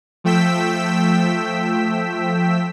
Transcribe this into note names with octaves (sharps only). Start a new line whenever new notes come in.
F3 A3 G5 E6 B6